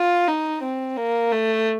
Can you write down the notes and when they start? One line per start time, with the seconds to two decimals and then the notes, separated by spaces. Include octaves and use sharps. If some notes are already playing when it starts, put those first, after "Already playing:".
Already playing: F4
0.28 D#4
0.62 C4
0.97 A#3
1.32 A3